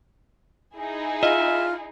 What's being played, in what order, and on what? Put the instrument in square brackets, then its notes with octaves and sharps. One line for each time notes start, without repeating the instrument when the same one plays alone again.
[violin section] D#4 E4 G#4
[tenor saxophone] F4 [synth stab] D#5 [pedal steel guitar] E5